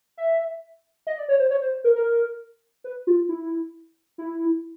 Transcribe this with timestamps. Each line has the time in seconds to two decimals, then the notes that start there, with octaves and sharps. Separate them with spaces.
0.18 E5
1.07 D#5
1.18 D5
1.29 C#5
1.39 C5
1.50 C#5
1.62 C5
1.84 A#4
1.95 A#4
2.84 B4
3.07 F4
3.29 E4
4.18 E4